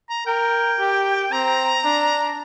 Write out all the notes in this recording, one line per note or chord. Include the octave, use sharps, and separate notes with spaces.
A#5
A#4 G5
G4
C4 A#5
D4